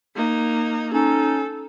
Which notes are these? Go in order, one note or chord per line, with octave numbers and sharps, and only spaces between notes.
A#3 D#4
C#4 D#4 A4